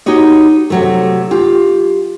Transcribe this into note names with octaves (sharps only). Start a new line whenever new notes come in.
D#4 F#4 G4 C#5 D#5
C3 F#3 A3
F4 G4